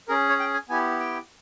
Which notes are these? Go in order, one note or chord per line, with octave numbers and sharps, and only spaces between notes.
C#4 G#4 A#4
C#5
G5
G#5
B3 E4 G4 G#5
G5